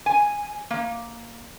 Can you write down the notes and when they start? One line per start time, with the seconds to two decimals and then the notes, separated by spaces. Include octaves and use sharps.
0.06 G#5
0.70 A#3